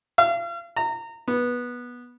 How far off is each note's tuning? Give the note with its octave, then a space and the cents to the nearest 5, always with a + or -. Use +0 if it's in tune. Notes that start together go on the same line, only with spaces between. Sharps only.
F5 -40
A#5 -25
B3 -15